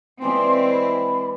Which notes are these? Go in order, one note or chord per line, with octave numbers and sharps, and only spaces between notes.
E3 G#3 C4 E4 D5 C6
B5